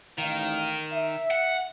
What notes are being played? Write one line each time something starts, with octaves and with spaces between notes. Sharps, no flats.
A1 D#3 D#4 F5
E5
F#5